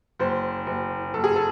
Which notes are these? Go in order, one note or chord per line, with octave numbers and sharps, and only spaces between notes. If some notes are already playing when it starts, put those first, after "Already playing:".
F#1 C5
F#1
F#1 A4
G#4
A4